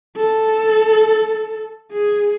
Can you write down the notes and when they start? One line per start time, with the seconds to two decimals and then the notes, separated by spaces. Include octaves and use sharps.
0.17 A4
1.92 G#4